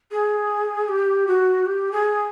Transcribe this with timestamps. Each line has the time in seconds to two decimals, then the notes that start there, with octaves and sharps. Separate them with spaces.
0.11 G#4
0.88 G4
1.27 F#4
1.66 G4
1.92 G#4